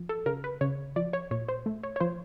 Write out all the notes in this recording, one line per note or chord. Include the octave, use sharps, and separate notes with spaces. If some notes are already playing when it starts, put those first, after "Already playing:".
Already playing: F3
A4
C#3 A#4
B4
C#3 C#5
F3 D5
C#5
A#2 C#5
C5
A3
C#5
C#5
F3 C5